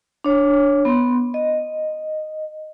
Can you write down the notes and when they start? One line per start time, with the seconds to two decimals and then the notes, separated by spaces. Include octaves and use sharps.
0.24 D4 C#5
0.85 B3 C6
1.34 D#5